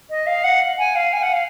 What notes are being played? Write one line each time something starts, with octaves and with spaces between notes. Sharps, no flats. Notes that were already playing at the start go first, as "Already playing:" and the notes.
D#5
F5
F#5
G#5
F5
G#5
F#5
F5